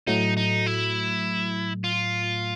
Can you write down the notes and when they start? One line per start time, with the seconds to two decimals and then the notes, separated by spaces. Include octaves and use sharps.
0.07 A2 F#3 A3 D#4
0.37 D#4
0.66 E4
1.84 F4